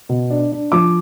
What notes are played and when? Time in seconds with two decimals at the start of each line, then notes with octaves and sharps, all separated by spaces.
0.09 B2
0.30 D4
0.52 D4
0.72 F3 D6